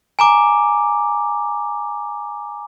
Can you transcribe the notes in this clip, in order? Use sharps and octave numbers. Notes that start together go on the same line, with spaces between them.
G#5 A#5 D6